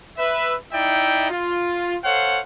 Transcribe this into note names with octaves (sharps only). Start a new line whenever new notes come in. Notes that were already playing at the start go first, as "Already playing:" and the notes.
B4 E5
D#4 E4 D5 E5 G5
F4
A4 C5 C#5 F5 F#5